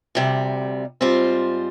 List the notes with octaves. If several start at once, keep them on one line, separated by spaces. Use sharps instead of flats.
D2 C3 G3
G#2 G3 C4 F4 C5